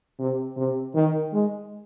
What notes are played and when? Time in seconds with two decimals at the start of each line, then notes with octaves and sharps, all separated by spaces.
0.19 C3
0.57 C3
0.95 D#3
1.33 G#3